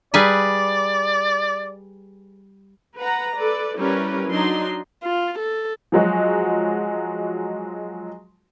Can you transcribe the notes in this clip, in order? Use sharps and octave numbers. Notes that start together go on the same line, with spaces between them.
G3 G#4 B4 D5
B4 F#5 A#5
A4 B4 D5
G3 C#4 E4 A#4 B4
F#3 D4 D#4 C6
F4
A4
F3 F#3 G#3 F#4